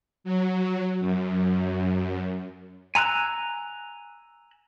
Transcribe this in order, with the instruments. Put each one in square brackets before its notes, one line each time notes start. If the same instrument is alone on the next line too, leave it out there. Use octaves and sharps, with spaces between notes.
[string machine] F#3
F#2
[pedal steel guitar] G#5 A#5 E6 F#6